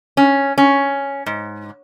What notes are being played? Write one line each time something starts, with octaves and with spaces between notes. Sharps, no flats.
C#4
C#4
G#2